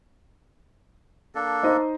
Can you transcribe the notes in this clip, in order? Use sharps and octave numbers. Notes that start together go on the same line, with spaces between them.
A#3 D4 A4
D#4 C5 D#5